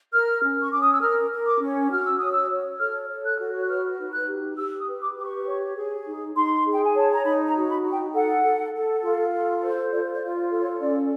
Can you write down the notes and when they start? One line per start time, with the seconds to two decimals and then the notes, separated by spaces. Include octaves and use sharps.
0.12 A#4 F6
0.43 C#4
0.62 C#6
0.72 C#4 D6
0.81 D#6
0.92 E6
1.01 A#4 F6
1.31 A#4
1.46 D6
1.61 C#4
1.91 F#4 F6
2.04 E6
2.18 C#5 D#6
2.31 E6
2.50 C#5
2.79 A4 F6
3.09 C#5
3.25 F#6
3.39 F#4
3.60 F#6
3.69 B4 F6
3.99 D#4
4.13 F#6
4.27 G4
4.57 G4 E6
4.80 D#6
4.88 B4
5.01 D6
5.17 G4 D6
5.24 C#6
5.47 C#5
5.76 G#4
6.06 D#4
6.36 D#4 C6
6.65 G#4
6.72 G5
6.84 G#5
6.95 C#5 A5
7.12 A#5
7.25 D#4 B5
7.46 A#5
7.55 F#4
7.70 B5
7.84 D#4
7.91 G5
8.13 A4 F#5
8.43 A4
8.74 A4
9.02 F4
9.32 A4
9.62 C5
9.92 F4 D5
10.14 D5
10.22 F4
10.36 D5
10.51 A4
10.59 C#5
10.81 C#4 D5